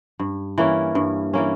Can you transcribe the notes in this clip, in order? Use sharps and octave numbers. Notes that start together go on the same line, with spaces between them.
G2
E3 A#3 C#4
G2
E3 A#3 C#4